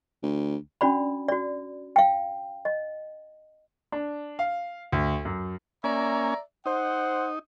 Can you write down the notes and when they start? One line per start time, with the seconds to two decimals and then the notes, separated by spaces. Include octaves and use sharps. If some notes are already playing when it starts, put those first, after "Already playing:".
0.23 D2
0.81 C#4 D4 F#4 D5 B5
1.28 F#4 D5
1.96 F5 G5
2.65 D#5
3.92 D4
4.39 F5
4.92 D2
5.25 F#2
5.84 A#3 C#4 D5 E5 G#5 A#5
6.66 D#4 C5 F#5